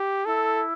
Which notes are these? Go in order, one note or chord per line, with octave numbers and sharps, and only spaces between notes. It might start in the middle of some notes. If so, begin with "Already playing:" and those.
Already playing: G4
E4 A4